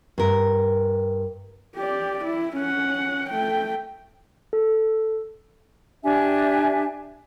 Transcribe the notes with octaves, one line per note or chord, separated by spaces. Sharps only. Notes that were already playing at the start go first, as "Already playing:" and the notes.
G2 A#4
G4 D5
E4
C#4 F#5
A3 G5
A4
D4 G4 E5 G#5